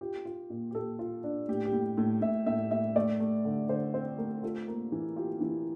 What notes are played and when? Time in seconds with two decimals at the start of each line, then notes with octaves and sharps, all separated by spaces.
0.01 F4 G4
0.25 F4
0.50 A#2
0.71 G4
0.75 A#2 A4
0.99 F4
1.24 D4
1.49 A2 G4
1.65 G4
1.73 A2
1.98 A2
2.22 A2 E5
2.46 A2 E5
2.71 A2 E5
2.96 A3 D5
3.20 A3
3.45 D3
3.69 D3 C5
3.94 C4 C5
4.18 A3 A#4
4.43 F4 A4
4.68 A#3
4.92 E3
5.16 F4 G4
5.41 E3